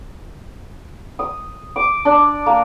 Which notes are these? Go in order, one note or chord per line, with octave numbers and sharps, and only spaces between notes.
D#6
D6
D4
A#3